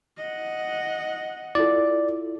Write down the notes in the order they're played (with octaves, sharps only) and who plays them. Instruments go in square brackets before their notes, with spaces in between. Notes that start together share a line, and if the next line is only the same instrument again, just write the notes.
[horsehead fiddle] D#5 F#5
[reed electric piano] E4 F4 A4 [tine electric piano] D5